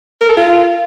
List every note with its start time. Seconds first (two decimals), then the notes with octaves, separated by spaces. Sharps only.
0.21 A#4
0.29 A4
0.37 F4